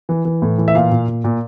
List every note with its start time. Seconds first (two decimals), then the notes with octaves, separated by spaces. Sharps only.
0.09 E3
0.25 E3
0.42 A2
0.58 E3
0.68 E5
0.75 A#2 F5
0.91 A#2
1.08 A#2
1.24 A#2